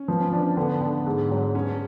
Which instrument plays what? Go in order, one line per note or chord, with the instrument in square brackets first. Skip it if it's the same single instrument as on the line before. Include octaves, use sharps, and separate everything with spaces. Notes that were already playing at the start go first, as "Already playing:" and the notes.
Already playing: [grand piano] C#4
[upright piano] F3 [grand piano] B3
[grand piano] C#4
[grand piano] B3 [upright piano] D4
[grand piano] C#4
[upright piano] D3 [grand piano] B3
[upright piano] D3
G#2
F#3
[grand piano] C#4 [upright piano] G#4